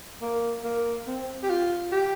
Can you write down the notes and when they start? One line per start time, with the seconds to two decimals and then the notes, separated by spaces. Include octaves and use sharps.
0.21 A#3
0.64 A#3
1.07 C4
1.43 G4
1.50 F4
1.92 G4